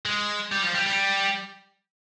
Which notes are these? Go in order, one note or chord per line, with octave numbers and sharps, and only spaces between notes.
G#3
G3
F3
G3
G3